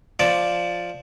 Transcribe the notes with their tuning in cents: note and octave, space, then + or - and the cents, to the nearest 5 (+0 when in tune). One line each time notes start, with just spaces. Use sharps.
F3 +0 D5 +0 A5 +0